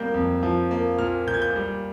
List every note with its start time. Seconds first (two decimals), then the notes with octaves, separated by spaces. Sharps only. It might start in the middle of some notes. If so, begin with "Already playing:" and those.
Already playing: C3 G3 A#3 G6
0.14 F2
0.43 F3
0.71 A#3
0.98 A#2 F6
1.27 A#2 G6
1.34 G#6
1.42 G6
1.56 G3